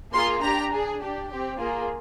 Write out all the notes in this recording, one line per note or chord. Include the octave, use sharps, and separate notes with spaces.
A#3 F4 G#4 C6
D4 G4 A#5
D4 G#4
D4 G4
C4 G4
A#3 F4 G#4